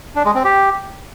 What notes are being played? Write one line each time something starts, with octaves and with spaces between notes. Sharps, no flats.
D4
G#3
C4
G4